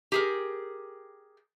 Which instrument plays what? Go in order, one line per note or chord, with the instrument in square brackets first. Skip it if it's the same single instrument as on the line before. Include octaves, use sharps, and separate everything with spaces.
[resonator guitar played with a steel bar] G4 G#4 A#4